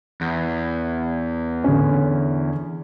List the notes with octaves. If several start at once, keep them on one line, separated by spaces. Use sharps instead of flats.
E2
D3 C#4